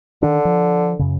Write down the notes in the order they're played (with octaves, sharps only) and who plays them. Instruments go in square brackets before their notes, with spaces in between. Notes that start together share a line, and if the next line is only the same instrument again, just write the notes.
[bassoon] D3 [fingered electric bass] D#3 D4
[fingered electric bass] F3
F#2 C#3